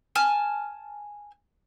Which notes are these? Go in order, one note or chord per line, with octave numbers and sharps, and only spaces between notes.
G#5 A5 F6